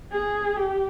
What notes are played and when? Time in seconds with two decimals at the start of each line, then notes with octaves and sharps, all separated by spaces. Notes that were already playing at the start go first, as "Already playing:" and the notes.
0.12 G#4
0.56 G4